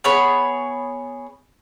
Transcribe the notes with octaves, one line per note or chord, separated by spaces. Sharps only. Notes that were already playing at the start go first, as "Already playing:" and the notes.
B3 G#4 C#5 B5